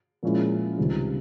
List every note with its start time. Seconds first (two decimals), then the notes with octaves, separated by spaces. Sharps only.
0.23 A#2 F3 G#3 C#4 E4
0.78 C#2 C3 D#3 G3